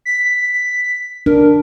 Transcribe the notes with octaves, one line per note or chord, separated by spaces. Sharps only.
B6
D4 A#4